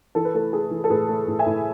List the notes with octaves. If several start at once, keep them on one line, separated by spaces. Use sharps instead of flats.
E3 A4
B4
A3 A4
A3 G#4
E3
A4
A2 G#4 B4
A3
A2
E5 G#5
A2